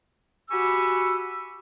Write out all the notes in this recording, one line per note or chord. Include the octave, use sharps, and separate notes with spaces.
F#4 G4 G#5 B5 C#6 E6